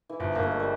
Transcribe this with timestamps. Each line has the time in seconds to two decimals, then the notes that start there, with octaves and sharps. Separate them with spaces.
0.09 E3
0.20 G1 F3
0.35 G1 A#3
0.43 A3
0.52 G#3
0.60 G3